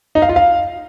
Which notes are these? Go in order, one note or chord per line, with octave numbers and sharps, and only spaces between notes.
D#4
F5
F4
F5